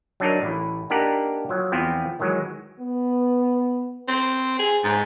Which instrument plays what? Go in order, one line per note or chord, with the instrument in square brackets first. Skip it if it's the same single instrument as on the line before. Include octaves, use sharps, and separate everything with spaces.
[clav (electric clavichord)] F#3 D4 D#4 A#4
A1 E4
A#3 D4 D#4 G4 A#4 F#5
F3 F#3
E2 F3 B3 C4
D#3 E3 F#3 G#3
[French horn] B3
[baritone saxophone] C4
G#4
G#2